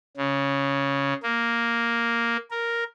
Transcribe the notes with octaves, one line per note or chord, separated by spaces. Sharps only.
C#3
A#3
A#4